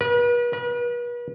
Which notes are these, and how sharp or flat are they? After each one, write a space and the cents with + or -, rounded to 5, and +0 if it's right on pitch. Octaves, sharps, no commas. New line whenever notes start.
B4 -40
B4 -40